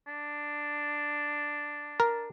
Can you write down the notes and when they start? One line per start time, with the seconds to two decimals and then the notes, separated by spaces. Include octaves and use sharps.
0.07 D4
2.00 A#4